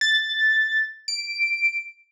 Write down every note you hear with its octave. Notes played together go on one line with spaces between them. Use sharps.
A6
D7